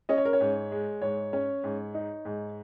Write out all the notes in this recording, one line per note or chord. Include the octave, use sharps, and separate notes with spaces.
C#4 D#5
C#5
A#4
C#5
G#2
G#3
G#2 C#5
C#4
G#2
D#4
G#2